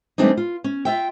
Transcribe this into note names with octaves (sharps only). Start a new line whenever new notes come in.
E3 G3 A3 C4 D4 D#4
F4
C#4
F4 E5 G5